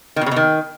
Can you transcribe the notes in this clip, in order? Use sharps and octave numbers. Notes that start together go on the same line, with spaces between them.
D#3
B2
C#3
B2
D#3